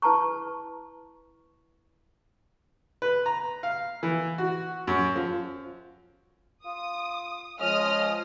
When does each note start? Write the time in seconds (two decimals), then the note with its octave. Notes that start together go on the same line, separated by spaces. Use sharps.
0.02 E4 B4 A5 A#5 C#6
3.02 B4
3.26 A#5
3.63 F5
4.03 E3
4.38 F#4
4.87 F#2
5.15 F3
6.65 F4 D#6
7.60 F3 G#3 C#4 D#5 D#6 F6